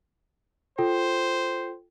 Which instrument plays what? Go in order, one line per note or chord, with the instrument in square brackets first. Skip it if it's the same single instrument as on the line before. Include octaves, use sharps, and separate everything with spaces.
[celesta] F4 A4 G5 [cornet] C5